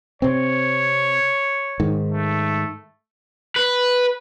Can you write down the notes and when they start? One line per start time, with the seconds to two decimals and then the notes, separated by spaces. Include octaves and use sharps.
0.22 C3 C4 C#5
1.80 G#2 D#3
2.12 A3
3.56 B4